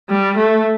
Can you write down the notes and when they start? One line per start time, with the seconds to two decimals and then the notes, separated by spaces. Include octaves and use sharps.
0.10 G3
0.37 A3